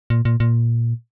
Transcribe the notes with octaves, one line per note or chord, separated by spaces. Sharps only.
A#2
A#2
A#2